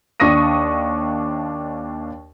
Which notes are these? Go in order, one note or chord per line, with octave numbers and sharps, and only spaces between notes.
D#2 D4 C#6 D#6 A#6 D#7